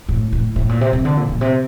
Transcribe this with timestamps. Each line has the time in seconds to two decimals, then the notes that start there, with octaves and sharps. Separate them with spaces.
0.09 A2
0.33 A2
0.56 A2
0.69 A#2
0.81 C3
0.93 C3
1.05 D3
1.17 A#2
1.29 A#2
1.41 C3